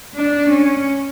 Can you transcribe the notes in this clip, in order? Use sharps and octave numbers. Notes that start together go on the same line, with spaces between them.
D4
C#4